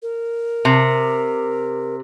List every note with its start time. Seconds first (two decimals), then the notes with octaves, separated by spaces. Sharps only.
0.02 A#4
0.65 C3